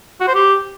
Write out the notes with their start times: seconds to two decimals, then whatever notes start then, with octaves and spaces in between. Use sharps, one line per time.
0.21 F#4
0.28 C5
0.35 G4